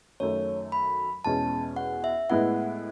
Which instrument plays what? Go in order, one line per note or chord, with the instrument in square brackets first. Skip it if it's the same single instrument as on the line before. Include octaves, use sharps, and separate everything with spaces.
[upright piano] F#2 D#3 F#3 A3 [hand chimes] C#5
[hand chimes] B5
[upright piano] E2 B2 G#3 C#4 [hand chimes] A5
[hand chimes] F#5
E5
[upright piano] A2 G#3 B3 E4 [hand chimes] F#5